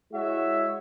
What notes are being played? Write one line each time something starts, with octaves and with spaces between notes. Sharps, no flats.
G#3 E4 F#4 C#5 E5